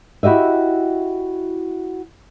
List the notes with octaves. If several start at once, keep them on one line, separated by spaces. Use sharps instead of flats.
E4 F#4 G4 D#5 E5